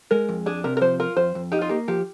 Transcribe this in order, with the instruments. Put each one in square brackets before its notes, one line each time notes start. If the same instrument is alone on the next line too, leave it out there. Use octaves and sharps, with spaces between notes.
[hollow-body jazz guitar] G#3 [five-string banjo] A#4
[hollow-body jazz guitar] F2
[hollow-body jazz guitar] D4 [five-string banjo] G#4
[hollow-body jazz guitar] C3 [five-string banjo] A#4
[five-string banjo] A#4
[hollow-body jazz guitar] F3 [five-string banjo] C5
[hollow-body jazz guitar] F4 [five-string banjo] A#4
[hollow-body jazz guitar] F2 [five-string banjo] C5
[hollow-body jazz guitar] F2
[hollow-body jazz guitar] D#4 [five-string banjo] G4
[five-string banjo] F4
[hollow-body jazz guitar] A#3 [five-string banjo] G4
[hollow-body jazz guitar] F3 [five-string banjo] G4